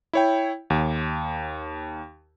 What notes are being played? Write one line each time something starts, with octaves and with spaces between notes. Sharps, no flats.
E4 C#5 G5
D#2